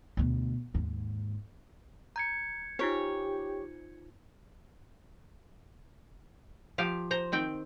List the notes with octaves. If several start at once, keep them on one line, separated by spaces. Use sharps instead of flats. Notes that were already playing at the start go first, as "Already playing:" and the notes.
D2 B2
D#2 G#2
A#5 G6 G#6 C#7
D#4 F4 G4 C5 C#5
F3 G4 F5
C5 A#5
D#3 C4 G5